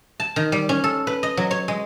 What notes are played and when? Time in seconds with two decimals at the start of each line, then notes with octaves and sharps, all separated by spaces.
0.20 A5
0.36 D#3
0.52 G3
0.69 C#4
0.84 A4
1.07 B4
1.23 D#5
1.37 F#3
1.51 C#5
1.68 G#3